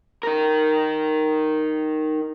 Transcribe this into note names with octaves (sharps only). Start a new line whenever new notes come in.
D#4 A#4